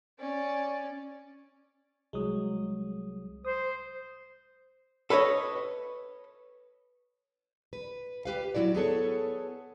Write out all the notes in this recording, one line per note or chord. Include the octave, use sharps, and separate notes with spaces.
C#4 D5
C2 F#3 G#3 D#6
C5 D#6
A4 B4 C#5 D#5
B4
G4 B4 F5
F#3 E4 F#4 D5
B3 G#4 A4 C#5